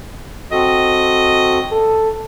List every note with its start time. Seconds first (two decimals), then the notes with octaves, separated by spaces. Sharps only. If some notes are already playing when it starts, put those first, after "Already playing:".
0.52 C4 F#4 A4 D#5
1.72 A4